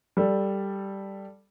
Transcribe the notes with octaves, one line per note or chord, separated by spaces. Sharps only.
G3 A4